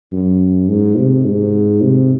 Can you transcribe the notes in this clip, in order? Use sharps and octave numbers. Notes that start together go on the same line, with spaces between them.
F#2
G#2
C3
G#2
C3